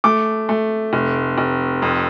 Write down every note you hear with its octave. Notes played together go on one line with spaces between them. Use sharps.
A3 D6
A3
F1
F1
F2